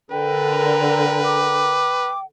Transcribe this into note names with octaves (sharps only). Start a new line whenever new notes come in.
D3 A#4 B4 G5
D6